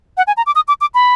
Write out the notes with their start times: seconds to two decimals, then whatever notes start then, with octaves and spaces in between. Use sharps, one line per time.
0.17 F#5
0.27 G#5
0.37 A#5
0.46 D6
0.55 D#6
0.68 D6
0.81 D6
0.94 B5